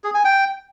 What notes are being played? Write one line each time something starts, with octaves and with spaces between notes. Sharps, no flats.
G#4
G#5
G5